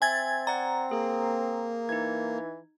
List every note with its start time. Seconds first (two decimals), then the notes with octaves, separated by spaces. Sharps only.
0.02 C4 E5 G#5 G#6 A6
0.47 D5 F#5 A#5
0.91 A#3 G#4
1.89 E3 D#4 G#6